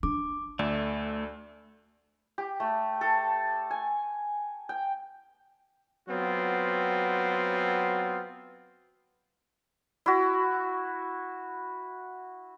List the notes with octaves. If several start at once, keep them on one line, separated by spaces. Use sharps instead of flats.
D4 D6
D2 A3 D5
G4
A3
A4
G#5
G5
F#3 B3 C4 F4
E4 F#4